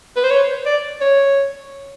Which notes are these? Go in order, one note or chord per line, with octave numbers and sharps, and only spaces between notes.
B4
C5
C#5
D5
C#5